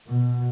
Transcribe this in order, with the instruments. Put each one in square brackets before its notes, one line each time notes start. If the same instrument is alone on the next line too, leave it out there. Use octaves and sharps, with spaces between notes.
[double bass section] B2